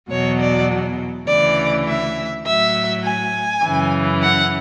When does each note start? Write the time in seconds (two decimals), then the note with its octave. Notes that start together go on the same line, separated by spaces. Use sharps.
0.10 E2 B2 F#3 C#5
0.40 D5
1.28 D2 C#3 E3 D5
1.87 E5
2.45 A2 F#3 E5
3.04 G#5
3.63 F#2 C#3 E3
4.22 F#5